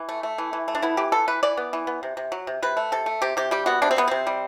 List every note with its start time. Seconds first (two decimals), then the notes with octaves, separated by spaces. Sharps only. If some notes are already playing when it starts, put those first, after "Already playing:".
Already playing: E3
0.09 A3
0.23 A3
0.38 E3
0.53 E3
0.68 A3
0.75 D4
0.82 B3 E4
0.97 E3 G4
1.12 B3 A4
1.28 E3 B4
1.43 E3 D5
1.57 B3
1.73 E3
1.87 B3
2.03 C3
2.17 C3
2.32 F#3
2.47 C3
2.62 C3 B4
2.77 A3
2.92 C3 A4
3.06 A3
3.22 C3 G4
3.37 C3 G4
3.51 G3 G4
3.66 B3 F#4
3.82 C3 D4
3.91 C4
3.96 C3 B3
4.08 C3 C4
4.27 G3